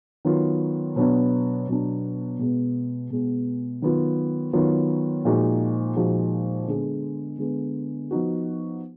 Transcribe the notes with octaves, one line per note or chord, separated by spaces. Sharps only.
D#3 F#3 B3 F4
B2 F#3 B3 D4
B2 F#3 B3 D4
B2 G#3 B3
B2 G#3 B3
D#3 F#3 B3 F4
D#3 F#3 B3 F4
A#2 F3 G#3 D#4 F#4
A#2 F3 G#3 D#4 F#4
D3 G#3 B3
D3 G#3 B3
F3 B3 D#4 F#4